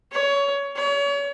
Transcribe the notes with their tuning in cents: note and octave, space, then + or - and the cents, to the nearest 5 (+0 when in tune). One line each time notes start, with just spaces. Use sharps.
C#5 +20
C#5 +35